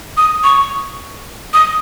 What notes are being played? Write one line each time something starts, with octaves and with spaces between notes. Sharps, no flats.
D#6
C#6
D#6